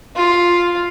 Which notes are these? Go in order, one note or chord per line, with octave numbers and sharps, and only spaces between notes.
F4